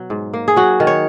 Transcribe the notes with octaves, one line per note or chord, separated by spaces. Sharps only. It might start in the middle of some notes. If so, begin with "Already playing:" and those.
Already playing: B2 F#3
G#2
A#3
G#4
F#3 F#4
D#3
C#5